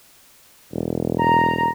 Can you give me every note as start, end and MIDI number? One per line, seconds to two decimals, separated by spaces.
0.73 1.69 28
1.19 1.68 82